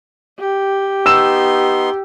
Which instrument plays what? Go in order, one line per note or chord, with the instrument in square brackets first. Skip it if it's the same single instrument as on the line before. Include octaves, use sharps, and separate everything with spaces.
[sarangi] G4
[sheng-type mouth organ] B3 D#4 C6 [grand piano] E6 E7